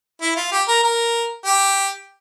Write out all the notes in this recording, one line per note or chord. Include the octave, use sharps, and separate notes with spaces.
E4
F4
G4
A#4
A#4
G4